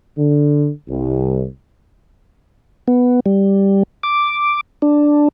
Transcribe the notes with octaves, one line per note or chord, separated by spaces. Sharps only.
D3
C2
B3
G3
D6
D4